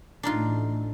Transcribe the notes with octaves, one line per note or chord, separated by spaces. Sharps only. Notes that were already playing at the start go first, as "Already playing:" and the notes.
A1 A2 A3 D4 D#4 F4